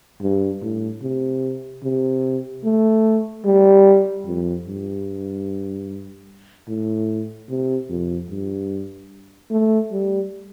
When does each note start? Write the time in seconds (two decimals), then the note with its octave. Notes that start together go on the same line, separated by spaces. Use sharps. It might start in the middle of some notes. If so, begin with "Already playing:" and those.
0.21 G2
0.62 A2
1.02 C3
1.83 C3
2.64 A3
3.45 G3
4.26 F2
4.66 G2
6.68 A2
7.50 C3
7.90 F2
8.30 G2
9.51 A3
9.92 G3